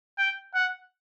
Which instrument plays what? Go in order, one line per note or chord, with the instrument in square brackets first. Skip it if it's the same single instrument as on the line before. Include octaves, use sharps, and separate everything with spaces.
[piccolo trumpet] G5
F#5